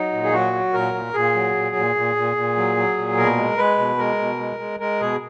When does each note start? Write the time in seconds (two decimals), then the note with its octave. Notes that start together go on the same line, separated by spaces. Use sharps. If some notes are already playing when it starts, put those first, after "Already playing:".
Already playing: F#3 D#4
0.13 A#2
0.23 G#4
0.33 F#3 F#4
0.53 F#3
0.73 A#2 A#4
0.94 A#2
1.14 A#2 G#4
1.34 F#3
1.55 A#2
1.76 A#2
1.96 A#2
2.16 A#2
2.36 A#2
2.57 F#3
2.77 F#3
2.98 A#2
3.17 B2 A#4
3.37 G#3
3.58 G#3 B4
3.79 B2
3.98 G#3 A#4
4.19 B2
4.39 G#3
4.59 G#3
4.80 G#3 A#4
5.01 B2 G#4